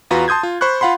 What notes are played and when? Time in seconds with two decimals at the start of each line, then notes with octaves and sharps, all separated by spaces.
0.11 E2 F4 F#4 B4 A#5
0.28 A5 C6 D#6 G6 G#6
0.43 F4
0.61 C5 B5 C#6 F#6
0.81 F4 F5 F#5 B5 C6